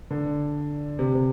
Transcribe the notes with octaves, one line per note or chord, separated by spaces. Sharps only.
D3
C3
C3